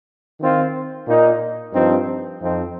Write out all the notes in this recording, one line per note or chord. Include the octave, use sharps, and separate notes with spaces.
D#3 C4 F4
A#2 A#3 D#4
G2 F3 C4 D#4
F2 F3 C4 D#4